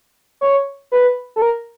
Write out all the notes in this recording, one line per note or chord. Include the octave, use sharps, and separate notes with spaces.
C#5
B4
A4
A#4